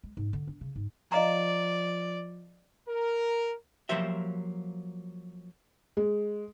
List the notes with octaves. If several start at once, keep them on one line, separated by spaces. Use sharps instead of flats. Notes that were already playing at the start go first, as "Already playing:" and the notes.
G#3
G#2
D3
D4
C#3
G#2
F3 D5 D#5 F5 A#5
A#4
F3 F#3 A#3 G4 C5 E5
G#3